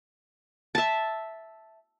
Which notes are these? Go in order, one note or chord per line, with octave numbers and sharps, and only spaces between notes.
E5 A5